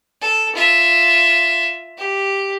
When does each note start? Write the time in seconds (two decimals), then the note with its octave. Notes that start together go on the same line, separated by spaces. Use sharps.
0.21 A4
0.56 F4 E5
1.98 G4